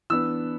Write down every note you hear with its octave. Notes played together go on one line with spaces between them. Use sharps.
E3 B3 D4 E6